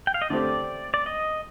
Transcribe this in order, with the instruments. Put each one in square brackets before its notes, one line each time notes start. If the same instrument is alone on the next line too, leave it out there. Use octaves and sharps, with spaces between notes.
[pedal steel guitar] G5
F5
D#5
[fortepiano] D3 A3 C4 G4 [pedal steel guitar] D5
[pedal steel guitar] D5
D#5